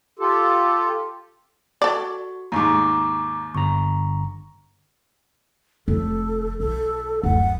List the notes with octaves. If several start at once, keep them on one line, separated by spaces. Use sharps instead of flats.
F4 G4 A4
F#4 A4 D5 C#6
D#2 G#2 A#5 C#6 D6
G1 A#5 C#6
F1 A4
B1 A4
D1 F#2 F#5